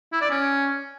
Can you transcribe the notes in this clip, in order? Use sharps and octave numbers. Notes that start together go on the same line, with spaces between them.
E4
D5
C#4